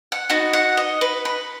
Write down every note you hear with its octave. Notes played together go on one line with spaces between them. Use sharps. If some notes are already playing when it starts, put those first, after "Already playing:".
F#5
B3 D#4 F#4
F#5
D#5
B4
B4